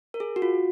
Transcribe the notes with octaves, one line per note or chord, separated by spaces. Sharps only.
A#4
G#4
F#4
F4